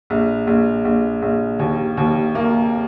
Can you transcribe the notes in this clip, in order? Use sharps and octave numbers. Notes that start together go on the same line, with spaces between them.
A#1
A#1
A#1
A#1
D#2
D#2
A#3